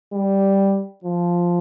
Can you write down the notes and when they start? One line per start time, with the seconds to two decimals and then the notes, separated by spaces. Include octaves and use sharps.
0.13 G3
1.04 F3